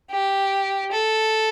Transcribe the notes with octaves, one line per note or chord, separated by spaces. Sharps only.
G4
A4